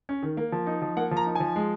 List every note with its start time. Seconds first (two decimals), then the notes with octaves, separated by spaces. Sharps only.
0.09 C#4
0.23 D#3
0.37 A#3
0.52 F3
0.66 D#4
0.82 F3
0.97 A#3 F#5
1.11 F3
1.17 A#5
1.26 D#4
1.35 F3 G#5
1.56 G#3